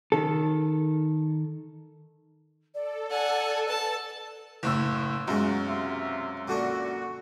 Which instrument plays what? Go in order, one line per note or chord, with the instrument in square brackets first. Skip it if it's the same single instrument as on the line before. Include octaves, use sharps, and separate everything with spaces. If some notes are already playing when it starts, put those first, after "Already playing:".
[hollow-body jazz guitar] D#3 A4
[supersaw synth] A4 [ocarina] D5
[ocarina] D5 [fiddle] F#5 G#5
[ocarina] B4 [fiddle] A5
[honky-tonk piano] F#1 A2 E6
[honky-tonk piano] F#2 [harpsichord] B2 G#3 [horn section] F4 F#4
[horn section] C3 F4 E5
[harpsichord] A#2 D3 D4 [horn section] F#4